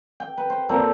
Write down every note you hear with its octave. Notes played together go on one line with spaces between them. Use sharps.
G5
B4
C5
A#2 C4 A4 A#5